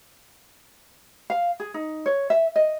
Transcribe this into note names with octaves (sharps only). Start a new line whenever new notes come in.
F5
G#4
D#4
C#5
E5
D#5